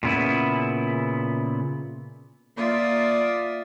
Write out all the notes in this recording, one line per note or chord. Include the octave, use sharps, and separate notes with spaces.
A#2 C#3 B3 E4
A#3 F4 D5 E5 D#6